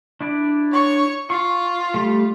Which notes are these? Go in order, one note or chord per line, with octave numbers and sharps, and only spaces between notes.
D4 E4 D5
C#5 C#6
F4 C#6
G3 A3